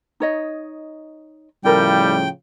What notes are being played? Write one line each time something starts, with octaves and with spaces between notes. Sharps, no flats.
D#4 C#5 D#5
A2 C#3 F3 G3 E4 A4 A#4 G5